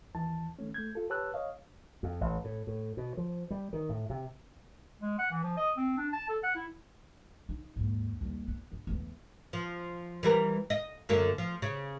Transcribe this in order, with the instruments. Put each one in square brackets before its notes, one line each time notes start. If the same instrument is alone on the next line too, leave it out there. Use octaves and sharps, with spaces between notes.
[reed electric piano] D#2 E3 A5
D#3 A3 C#4
A3 G6 G#6
F4 A4
G4 B4 C#5 A5 E6 F#6
C#5 D#5 F5
[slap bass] F2
A1
A2
A2
B2
F3
G3
D#3
A2
C3
[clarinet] G#3
F#5
E3
F3
D#5
C4
D4
A5
A4
F#5
E4
[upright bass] D#4
D#2 G#2
D#2 G3
B3
C#3
E2 A3
[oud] F3
E3 G3 A#4
D#5
F#2 D3 A#3
F3
C#3